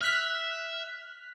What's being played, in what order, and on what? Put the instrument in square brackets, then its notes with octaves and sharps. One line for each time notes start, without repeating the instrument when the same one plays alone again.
[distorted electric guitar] E5 [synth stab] F6 F#6 B6